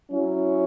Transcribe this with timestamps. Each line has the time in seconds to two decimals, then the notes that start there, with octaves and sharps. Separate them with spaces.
0.10 F#3 C#4 E4